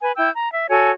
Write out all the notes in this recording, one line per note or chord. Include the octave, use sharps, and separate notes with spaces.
B4 G#5
E4 G5 E6 G6
A#5
E5
F#4 A4 C#5 G#5